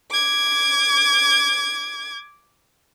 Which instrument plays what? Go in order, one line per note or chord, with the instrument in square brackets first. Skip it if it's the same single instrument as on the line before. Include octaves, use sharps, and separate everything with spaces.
[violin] D6 G#6